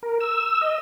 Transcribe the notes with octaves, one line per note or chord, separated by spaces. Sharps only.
A#4
E6
D#5